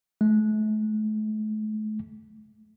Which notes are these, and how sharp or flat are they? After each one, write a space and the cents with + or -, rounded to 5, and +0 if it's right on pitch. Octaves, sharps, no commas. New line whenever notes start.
A3 -40